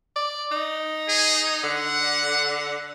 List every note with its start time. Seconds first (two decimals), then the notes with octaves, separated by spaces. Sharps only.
0.16 D5
0.52 D#4
1.09 G#4
1.63 D3 F#5